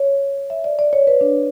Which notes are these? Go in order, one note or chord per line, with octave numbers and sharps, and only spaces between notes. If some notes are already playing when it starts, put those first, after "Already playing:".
Already playing: C#5
E5
D5
D5
C#5
B4
D4